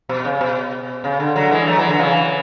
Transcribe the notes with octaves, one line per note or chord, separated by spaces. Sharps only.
B2
C#3
B2
C#3
D3
D3 F#3
E3 G#3
F#3 A3
E3 G#3
D3 F#3
C#3 E3